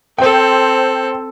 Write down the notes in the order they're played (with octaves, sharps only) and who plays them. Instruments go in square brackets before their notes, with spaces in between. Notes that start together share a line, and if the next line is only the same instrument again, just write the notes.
[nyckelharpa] C4 A4 [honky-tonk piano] C5 G5